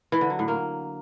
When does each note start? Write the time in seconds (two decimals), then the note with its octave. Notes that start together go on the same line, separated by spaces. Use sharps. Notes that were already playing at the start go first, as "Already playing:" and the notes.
0.12 E3
0.21 D3
0.30 F#3
0.39 A2
0.48 A#3